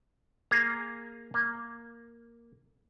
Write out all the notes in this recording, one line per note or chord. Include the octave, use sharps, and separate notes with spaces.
A#3 G#4 A#5
A#3